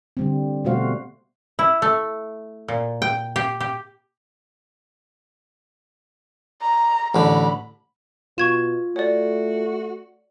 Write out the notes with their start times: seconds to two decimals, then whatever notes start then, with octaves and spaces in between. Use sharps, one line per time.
0.17 D3 G3 C4
0.65 B2 G3 A3 F#4 C5 F5
1.59 E4
1.82 A3
2.68 A#2
3.02 G5
3.36 G4
3.60 G4
6.62 A#5
7.15 A1 D3 B5
8.38 B2 F4 C#6 G#6 E7
8.96 A3 F#4 C#5 D5